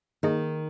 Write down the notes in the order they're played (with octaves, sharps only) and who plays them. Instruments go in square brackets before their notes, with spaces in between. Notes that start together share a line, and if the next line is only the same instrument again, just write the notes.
[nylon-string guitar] D#3 [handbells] A#3 D#4 G#4 D#5